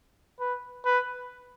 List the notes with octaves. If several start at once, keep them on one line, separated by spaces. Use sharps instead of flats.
B4
B4